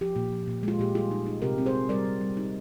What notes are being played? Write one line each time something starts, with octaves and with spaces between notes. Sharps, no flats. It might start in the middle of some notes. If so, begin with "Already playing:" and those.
F3 G4
A#2
F3
A#2
G#3 F4
A#2 G4
G3 F4 G#4
D#4
D#4
C3 G4 A#4
C4
G#4 C5
C4
G3 A#4 D5
G3
G3
D#4